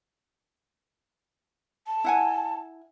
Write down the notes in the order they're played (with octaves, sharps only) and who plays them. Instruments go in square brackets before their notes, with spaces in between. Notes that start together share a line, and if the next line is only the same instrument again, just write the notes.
[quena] A5
[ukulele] E4 F#5 G#5